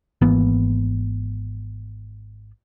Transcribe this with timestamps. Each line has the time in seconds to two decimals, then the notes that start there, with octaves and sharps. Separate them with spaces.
0.21 G#1 E3 A#3 B3